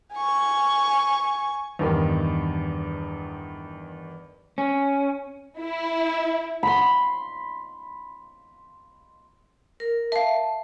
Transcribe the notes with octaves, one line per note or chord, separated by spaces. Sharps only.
G#5 C#6
E2 G2 D#3
C#4
E4
B5 C6
A#4
E5 F5 A5